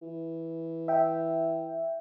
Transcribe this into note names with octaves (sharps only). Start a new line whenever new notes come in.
E3
E5 G5